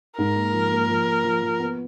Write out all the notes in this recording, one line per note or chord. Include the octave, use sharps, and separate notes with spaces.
G#2 A#4
A#3
F3
A#3
F3
A#3
F3
F3
B3